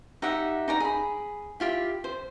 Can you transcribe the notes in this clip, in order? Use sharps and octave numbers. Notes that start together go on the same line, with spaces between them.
D#4 G4 E5 F#5
D#4 D5 A#5
G#4 B5
E4 F4 G4
C5